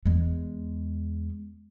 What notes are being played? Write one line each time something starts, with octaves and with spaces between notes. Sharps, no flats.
E2 G#3